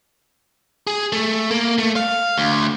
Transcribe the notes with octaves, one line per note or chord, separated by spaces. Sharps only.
G#4
A3
A#3
A3
F5
D2